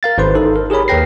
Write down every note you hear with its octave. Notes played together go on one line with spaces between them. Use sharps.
A#4 F5 A6
G#1 B4 C5 C6
D#4 A4
A#4
G4 G#4 A#4 C#5 B5
D#2 A#4 B4 G5 A#6 C7